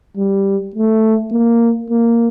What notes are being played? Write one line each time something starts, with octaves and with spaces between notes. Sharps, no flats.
G3
A3
A#3
A#3